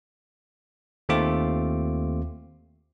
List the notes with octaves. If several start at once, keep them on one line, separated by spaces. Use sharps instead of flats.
D#2 A3 C4 F4 D6